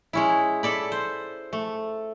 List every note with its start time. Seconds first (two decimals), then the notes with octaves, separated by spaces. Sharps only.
0.13 G#3 C#4 E4
0.63 A4 D5 B5
0.92 C5
1.53 A3